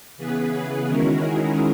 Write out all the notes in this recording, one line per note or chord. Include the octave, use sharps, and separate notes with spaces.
C#3 E3 B3 G#4 B4
G#4
D#3 G#3 C#4 E4 F#4 A#4
G#4